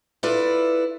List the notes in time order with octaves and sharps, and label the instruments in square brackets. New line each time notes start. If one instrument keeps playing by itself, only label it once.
[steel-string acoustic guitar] E4 F4 A4 B4 D5